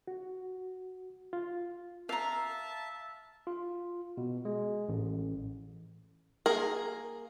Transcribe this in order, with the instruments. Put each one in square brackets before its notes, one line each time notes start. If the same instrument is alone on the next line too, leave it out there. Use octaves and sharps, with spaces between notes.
[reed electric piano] F#4
F4
[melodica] E5 A5 [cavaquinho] F5 A#5
[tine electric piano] F4
B2
G#3
A1
[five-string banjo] A#3 G#4 A#4